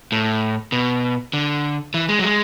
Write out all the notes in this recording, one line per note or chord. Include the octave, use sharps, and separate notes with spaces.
A2
B2
D3
E3
G#3
F#3
G#3